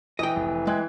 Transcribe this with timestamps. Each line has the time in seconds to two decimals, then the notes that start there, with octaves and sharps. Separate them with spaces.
0.19 E3 D#5 G5 D#6
0.36 F1
0.67 G#3 G5 F#6 G#6